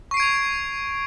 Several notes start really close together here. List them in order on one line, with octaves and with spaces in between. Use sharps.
C#6 C7 D7 G#6 F7